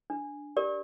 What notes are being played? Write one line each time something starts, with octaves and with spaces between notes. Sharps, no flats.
D4
G4 A#4 D5